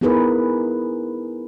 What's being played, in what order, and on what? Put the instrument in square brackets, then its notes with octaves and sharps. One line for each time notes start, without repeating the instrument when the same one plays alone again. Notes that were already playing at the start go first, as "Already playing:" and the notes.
[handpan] B3 D#4 E4 G#4 A#4 B4